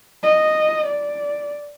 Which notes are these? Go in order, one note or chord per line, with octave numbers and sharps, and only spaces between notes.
D#5
D5